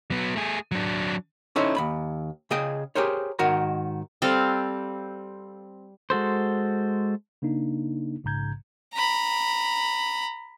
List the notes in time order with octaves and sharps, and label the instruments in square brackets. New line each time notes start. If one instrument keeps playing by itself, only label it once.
[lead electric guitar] F#3 B3
A3 G#4
F#3 D4
[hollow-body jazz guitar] C#4 D#4 E4 A4 C5 C#5
D#2 B5
C#3 G#4 D#5 G5
G4 G#4 A#4 C5 C#5
G#2 D#3 F#4 A#4 A#5
[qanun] G3 C4 A4 F5
[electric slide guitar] G#3 F#4 A4 C5
[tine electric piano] C#3 A#3 D4 D#4
A#1 G#2 C#3 A#5 G6 G#6
[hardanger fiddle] A#5 B5